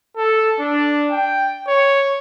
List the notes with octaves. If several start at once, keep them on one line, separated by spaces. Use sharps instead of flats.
A4
D4
G5
C#5